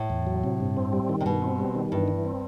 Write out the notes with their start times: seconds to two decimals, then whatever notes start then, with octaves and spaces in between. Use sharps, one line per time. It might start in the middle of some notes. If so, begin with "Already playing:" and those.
Already playing: A2
0.10 E2
0.27 F#3
0.44 C3
0.60 G2
0.77 C4
0.93 G3
1.09 D#3
1.21 C3
1.25 G2 B2
1.42 C4
1.58 G3
1.75 D#3
1.92 G2 E3
2.08 E3
2.25 C4